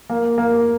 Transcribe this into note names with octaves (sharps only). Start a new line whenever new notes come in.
A#3
A#3